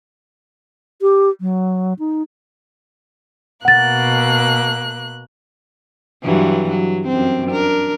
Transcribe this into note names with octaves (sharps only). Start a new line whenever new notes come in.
G4
F#3
D#4
B2 A#3 F#5 F#6 A6
G2 E3 F#3
F#3
F#2 C4
D4 A#4